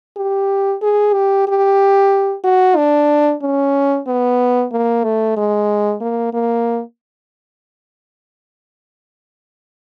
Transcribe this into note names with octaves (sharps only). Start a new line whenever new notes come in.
G4
G#4
G4
G4
F#4
D4
C#4
B3
A#3
A3
G#3
A#3
A#3